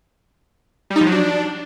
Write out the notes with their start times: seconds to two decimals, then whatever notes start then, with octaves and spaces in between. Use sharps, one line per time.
0.90 G3
0.96 D#4
1.01 F3
1.06 F#3
1.12 D4